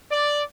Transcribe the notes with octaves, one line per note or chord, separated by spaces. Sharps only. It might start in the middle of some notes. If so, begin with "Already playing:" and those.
D5